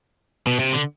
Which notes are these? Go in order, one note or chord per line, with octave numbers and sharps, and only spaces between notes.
B2
C3
D3